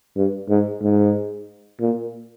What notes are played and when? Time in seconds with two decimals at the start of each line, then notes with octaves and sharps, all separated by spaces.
0.16 G2
0.49 G#2
0.81 G#2
1.80 A#2